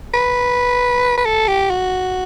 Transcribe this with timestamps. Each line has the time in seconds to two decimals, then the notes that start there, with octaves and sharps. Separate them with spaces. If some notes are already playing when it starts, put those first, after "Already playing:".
0.14 B4
1.17 B4
1.25 A4
1.48 G4
1.70 F#4